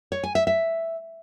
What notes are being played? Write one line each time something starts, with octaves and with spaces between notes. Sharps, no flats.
C#5
G#5
E5
E5